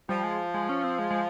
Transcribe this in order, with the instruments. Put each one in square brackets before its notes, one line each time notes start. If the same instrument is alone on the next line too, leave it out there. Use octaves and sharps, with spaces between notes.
[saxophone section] F3 [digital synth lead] G3
[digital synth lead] G#3
G#3
C#4
C4
G#3
G#3